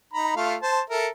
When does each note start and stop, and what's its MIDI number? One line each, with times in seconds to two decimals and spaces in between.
0.13 0.34 63
0.13 0.34 82
0.13 0.34 83
0.36 0.55 57
0.36 0.55 65
0.36 0.55 77
0.62 0.81 72
0.62 0.81 81
0.90 1.08 69
0.90 1.08 70
0.90 1.08 76